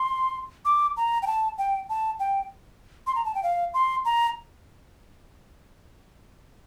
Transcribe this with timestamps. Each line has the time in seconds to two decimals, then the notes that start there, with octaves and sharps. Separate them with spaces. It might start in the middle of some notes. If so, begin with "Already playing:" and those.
Already playing: C6
0.65 D6
0.97 A#5
1.22 G5
1.27 A5
1.58 G5
1.89 A5
2.20 G5
3.07 C6
3.15 A#5
3.25 A5
3.35 G5
3.43 F5
3.74 C6
4.05 A#5